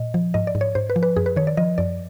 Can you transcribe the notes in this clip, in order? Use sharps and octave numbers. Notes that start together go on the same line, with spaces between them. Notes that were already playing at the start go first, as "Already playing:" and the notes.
Already playing: A#2 D#5
F3
G#2 D#5
D5
G#2
C#5
G#2 C5
B4
F3
B4
F#2 G#4
B4
D#3 C#5
D5
F3 D#5
F#2 D5